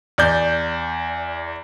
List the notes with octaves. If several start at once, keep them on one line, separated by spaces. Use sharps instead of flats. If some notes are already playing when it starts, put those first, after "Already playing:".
E2 D5 G6